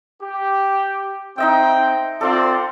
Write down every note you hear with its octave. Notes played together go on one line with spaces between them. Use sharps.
G4
C4 D#4 D#5 E5 G5
C4 F4 A4 D5